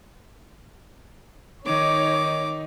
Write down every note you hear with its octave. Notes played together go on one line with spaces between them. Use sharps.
D#3 D#4 C#5 D6